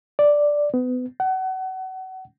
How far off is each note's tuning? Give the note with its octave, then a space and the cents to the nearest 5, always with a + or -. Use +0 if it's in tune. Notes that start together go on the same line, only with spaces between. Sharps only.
D5 +0
B3 +30
F#5 +30